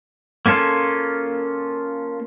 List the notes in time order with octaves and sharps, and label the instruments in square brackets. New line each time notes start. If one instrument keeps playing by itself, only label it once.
[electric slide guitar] A#3 C#4 F4 A4